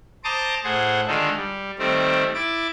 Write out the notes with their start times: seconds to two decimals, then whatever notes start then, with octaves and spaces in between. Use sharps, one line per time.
0.24 C5 A5 A#5 D6 D#6
0.64 A2 G#4 C5 F#5
1.07 D3 D#3 G#3 D#4 F4 A4
1.37 G3
1.79 D#3 G3 A3 C4
2.34 E4 D6 A6